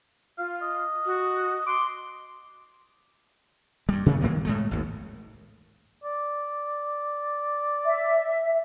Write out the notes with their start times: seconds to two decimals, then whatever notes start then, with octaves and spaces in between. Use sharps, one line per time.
0.38 F4 F5
0.61 D#5
1.06 F#4
1.67 C6 D6
3.89 G2 G3
4.06 C3 D#3 G3 A3
4.21 G2 D#3 A#3 B3
4.45 A2 G#3 A3
4.71 G#1 D#2
6.04 D5
7.85 E5